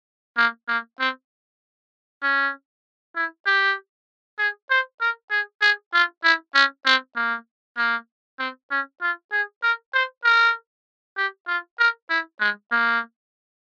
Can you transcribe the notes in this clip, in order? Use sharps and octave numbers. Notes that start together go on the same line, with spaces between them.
A#3
A#3
C4
C#4
E4
G4
G#4
C5
A#4
G#4
G#4
F4
E4
C#4
C4
A#3
A#3
C4
C#4
F4
G#4
A#4
C5
A#4
G4
F4
A#4
E4
G#3
A#3